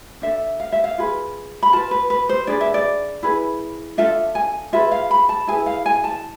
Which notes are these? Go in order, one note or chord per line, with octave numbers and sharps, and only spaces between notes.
D4 A4 E5
F5
E5
F5
F4 G#4 B4
B5
F4 B4 A5
B4
B4
C5
D4 G#4 B4 D5
E5
D5
E4 G#4 B4
D4 F4 A4 E5
G#5
F4 G#4 B4 E5
F5
B5
A5
E4 G#4 B4 G#5
F5
G#5
A5